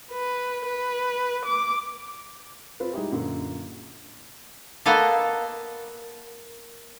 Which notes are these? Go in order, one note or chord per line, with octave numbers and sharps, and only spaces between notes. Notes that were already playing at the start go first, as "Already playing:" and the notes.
B4
B4
D6
C4 F4 B4
G3 G#3 D#4 E4 G4
F#2 A#2 D3
A#3 B3 A4 D#5 F5